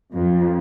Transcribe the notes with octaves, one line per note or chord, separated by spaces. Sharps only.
F2